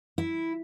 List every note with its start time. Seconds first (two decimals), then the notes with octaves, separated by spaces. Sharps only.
0.18 E4